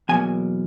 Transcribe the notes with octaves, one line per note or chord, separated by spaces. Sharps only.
E2 B2 F#3 A#3 G#5